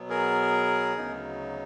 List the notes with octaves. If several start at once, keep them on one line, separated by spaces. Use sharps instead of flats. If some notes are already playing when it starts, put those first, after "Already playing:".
Already playing: B2 F#3 B3
G#4 A#4
D2 C#3 F#3 B3 D#4